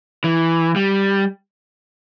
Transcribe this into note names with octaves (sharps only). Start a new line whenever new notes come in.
E3
G3